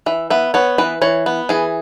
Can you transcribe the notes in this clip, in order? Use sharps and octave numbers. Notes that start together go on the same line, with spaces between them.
E3 E5
B3 E5
B3 C#5
E3 B4
E3 C#5
B3
E3 G#4